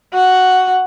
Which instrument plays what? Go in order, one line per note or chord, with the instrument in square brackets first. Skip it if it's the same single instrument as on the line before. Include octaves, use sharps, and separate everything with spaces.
[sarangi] F#4